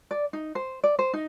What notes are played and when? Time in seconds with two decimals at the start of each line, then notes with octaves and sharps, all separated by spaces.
0.11 D5
0.33 D#4
0.55 C5
0.84 D5
0.99 C5
1.13 D#4